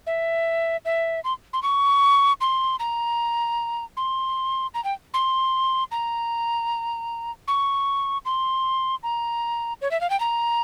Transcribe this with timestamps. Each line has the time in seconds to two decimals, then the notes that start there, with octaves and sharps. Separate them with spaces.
0.07 E5
0.85 E5
1.24 C6
1.53 C6
1.63 C#6
2.41 C6
2.79 A#5
3.97 C6
4.74 A#5
4.84 G5
5.14 C6
5.91 A#5
7.48 C#6
8.25 C6
9.03 A#5
9.81 C#5
9.91 E5
10.01 F5
10.10 G5
10.20 A#5